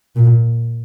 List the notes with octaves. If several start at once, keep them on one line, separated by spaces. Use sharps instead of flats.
A#2